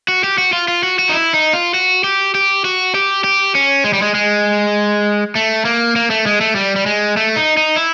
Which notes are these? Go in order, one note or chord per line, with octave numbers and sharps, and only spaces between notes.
F#4
G4
F#4
F4
F4
F#4
F#4
D#4
E4
D#4
F4
F#4
G4
G4
F#4
G4
G4
C#4
G#3
G3
G#3
G#3
A3
A#3
A#3
A3
G#3
A3
G3
G3
G#3
A3
D#4
D#4
E4